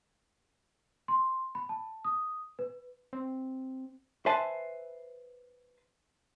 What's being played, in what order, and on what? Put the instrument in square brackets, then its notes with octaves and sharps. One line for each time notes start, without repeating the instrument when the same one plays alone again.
[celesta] C6
B5
A5
D#6
B4
[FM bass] C4
[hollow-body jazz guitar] B4 C5 E5 G#5 A5